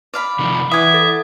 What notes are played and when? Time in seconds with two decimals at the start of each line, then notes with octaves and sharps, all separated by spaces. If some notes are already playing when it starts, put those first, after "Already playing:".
0.14 D5 F5 B5
0.39 C3 D#3 F3
0.72 E3 D5 E5 F#5 D#6 G#6
0.94 A4 A6